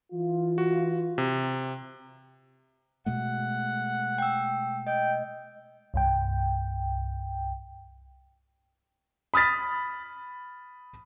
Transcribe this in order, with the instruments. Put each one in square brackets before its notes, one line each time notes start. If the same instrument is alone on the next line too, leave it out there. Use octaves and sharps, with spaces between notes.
[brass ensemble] E3 F4
[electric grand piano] F#4
C3
[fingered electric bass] B2 G#3 A3 [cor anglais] F#5
[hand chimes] G5 E6
[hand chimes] D#5 [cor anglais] G5
[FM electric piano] C2 G2 G5
[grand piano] B5 D#6 F6 A6 B6